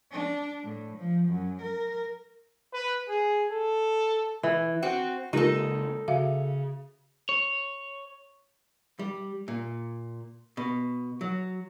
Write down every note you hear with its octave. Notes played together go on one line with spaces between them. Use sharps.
D4
A2
F3
F#2
A#4
B4
G#4
A4
E3
C4 F#4
C#3 G#3 A#3 D#4 F4 G4 A4 A#4
C#3 F#4 E5 F5
C#5
G3
A#2
B2
F#3